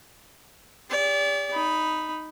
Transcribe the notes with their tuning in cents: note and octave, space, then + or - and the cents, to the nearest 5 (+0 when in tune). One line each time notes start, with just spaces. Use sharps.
G4 +40 D5 -35
D#4 +0 B5 +0